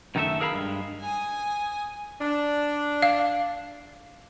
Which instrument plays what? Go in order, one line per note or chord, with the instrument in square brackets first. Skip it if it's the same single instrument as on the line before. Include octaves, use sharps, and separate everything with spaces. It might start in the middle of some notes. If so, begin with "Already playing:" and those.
[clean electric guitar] F#2 D#3 A3 D#4 A4 E5
G#4 A#4 F5 F#5 B5
G2 G#3
[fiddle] G#5 D#6
[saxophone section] D4
[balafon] F5